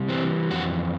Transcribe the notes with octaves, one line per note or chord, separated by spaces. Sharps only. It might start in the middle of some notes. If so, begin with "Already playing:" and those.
Already playing: C3 G3
E3 C4
F2 F#4